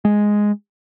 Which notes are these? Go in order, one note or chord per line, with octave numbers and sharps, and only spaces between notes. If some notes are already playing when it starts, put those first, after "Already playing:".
G#3